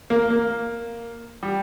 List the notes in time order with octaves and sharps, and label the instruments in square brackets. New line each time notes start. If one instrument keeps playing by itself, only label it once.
[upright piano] A#3
A#3
G3